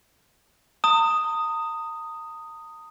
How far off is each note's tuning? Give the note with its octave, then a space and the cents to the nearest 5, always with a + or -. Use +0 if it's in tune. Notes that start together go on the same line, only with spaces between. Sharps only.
A#5 -40 D#6 +0